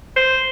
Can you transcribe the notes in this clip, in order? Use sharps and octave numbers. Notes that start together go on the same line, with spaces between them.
C5